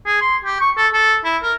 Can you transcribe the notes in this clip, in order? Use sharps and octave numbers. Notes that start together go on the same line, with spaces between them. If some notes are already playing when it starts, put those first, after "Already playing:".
G#4
C6
G4
C#6
A4
A4
E4
A#4